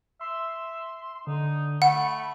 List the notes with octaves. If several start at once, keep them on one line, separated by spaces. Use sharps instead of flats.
E5 C6
D3 D#4
A3 F#5 B5